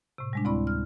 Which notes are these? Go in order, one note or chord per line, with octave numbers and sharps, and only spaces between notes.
A2 C3
G3 G#3 D4
D2 C4 E4 D5 B5 C#6
F6